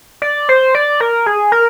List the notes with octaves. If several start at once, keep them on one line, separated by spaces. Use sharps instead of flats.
D5
C5
D5
A#4
G#4
A#4